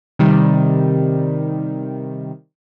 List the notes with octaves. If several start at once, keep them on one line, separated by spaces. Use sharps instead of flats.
C3 D#3 G3